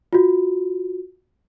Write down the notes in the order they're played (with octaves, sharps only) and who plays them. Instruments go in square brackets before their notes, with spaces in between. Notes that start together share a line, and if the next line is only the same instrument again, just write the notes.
[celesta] F4 F#4